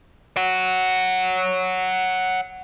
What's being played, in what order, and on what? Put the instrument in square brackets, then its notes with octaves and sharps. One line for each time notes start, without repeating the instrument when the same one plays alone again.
[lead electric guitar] C#5 F#5